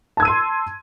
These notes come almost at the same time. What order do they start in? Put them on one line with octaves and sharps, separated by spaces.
A5 G#6 E6 D#7 C6